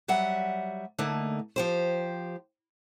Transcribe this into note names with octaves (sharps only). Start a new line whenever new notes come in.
F#3 G3 E5 F#5
D3 A3 A#3 D#4
F3 G4 C5